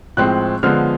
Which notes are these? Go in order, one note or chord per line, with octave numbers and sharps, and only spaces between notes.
A2 F3 G#3 C4 F#6
D3 F3 G#3 B3 F6